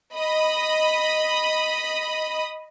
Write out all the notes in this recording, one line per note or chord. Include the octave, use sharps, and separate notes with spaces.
D#5 B5 D#6